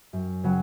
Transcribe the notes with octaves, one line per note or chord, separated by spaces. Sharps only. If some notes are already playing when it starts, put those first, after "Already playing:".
F#2
C#3 F#3 C#4 F#4